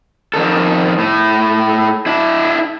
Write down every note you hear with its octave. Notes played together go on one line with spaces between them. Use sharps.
F2 B2 D#3 A4
A2 A3
D4 E4